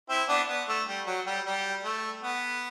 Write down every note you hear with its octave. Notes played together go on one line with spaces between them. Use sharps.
C4 E4
B3 D4
B3
A3
G3
F#3
G3
G3
A3
B3